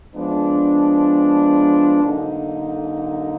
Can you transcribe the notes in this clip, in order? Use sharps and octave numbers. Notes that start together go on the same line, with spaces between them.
F3 G#3 B3 D4
D3 F#3 A#3 D#4